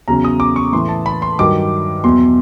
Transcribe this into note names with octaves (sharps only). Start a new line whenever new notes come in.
E2 C#3 F#3 A#5
D#6
D6
C#6
A2 E3 C6
A5
B5
C6
G2 D#3 F#3 D6
E2 B2 F#3 C6